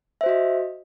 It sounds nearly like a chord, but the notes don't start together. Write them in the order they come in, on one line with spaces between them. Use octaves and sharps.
E5 C5 F#4 D#5